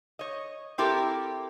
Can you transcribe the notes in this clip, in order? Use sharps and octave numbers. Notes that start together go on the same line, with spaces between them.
C#5 D#5
C4 E4 G4 A4 A#4